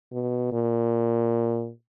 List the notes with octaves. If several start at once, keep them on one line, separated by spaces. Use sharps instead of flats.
B2
A#2